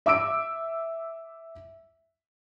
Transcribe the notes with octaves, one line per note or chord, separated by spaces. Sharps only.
E5 D6 E6 D7